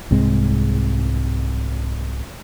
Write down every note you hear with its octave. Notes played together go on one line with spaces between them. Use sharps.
C2 G#2 G#3 C4